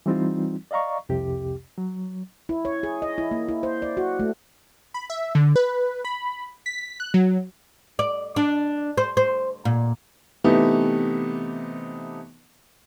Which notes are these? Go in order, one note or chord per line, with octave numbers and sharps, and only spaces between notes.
E3 G3 C4 D#4 F4
D5 D#5 F5 A#5 C#6
C2 F2 C3 G4
F#3
E4
C#5
G#4
D#5
E4
A#3
E4
C5
D5
F#4
A3
B5
E5
D3
B4
B5
B6
F#6
F#3
D5
D4
C5
C5
A#2
C3 E3 A3 B3 D#4 G4